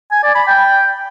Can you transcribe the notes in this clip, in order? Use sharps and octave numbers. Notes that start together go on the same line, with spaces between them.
G#5
D5
B5
G5